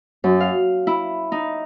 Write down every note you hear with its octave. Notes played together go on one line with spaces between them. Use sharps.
F#2
F5
E4
D#4